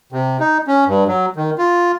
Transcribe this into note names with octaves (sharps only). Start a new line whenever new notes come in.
C3
D#4
C#4
G2
F#3
D#3
F4